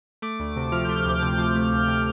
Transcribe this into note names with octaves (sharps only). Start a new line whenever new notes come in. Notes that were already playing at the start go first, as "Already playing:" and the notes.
A3 D6
D2
C3
F3 F6
A3 G6
F6
D2 D6
C3 D6
F3
A3
D2
C3